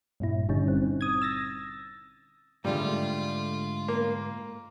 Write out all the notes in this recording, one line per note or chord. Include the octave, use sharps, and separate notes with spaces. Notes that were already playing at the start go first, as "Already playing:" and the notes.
G2 A#2 E4
G#1 D3 G3 C#4 D#4
C4
D#6 G#6
E6 A6 A#6
G#2 D3 G3 A3 F4
A#3